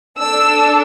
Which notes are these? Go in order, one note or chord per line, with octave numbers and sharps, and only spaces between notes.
D4 A4 E6